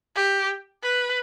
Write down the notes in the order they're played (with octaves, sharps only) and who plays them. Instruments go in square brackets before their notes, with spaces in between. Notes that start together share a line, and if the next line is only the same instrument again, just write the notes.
[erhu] G4
B4